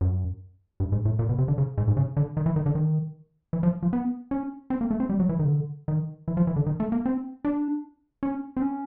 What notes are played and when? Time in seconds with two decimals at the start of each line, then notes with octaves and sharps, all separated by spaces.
0.01 F#2
0.80 G2
0.92 G#2
1.05 A2
1.19 A#2
1.29 B2
1.39 C3
1.48 D3
1.58 C#3
1.78 G#2
1.88 G#2
1.97 C#3
2.17 D3
2.37 D#3
2.46 E3
2.56 D#3
2.66 D3
2.75 D#3
3.53 E3
3.63 F3
3.83 F3
3.93 B3
4.31 C#4
4.70 C4
4.81 A#3
4.91 A3
5.00 C4
5.10 G3
5.20 F#3
5.29 E3
5.39 D#3
5.45 C#3
5.49 D3
5.88 D#3
6.28 E3
6.37 F3
6.47 E3
6.56 D3
6.67 D#3
6.80 A3
6.92 A#3
7.06 C4
7.45 D4
8.23 C#4
8.57 C4
8.62 C#4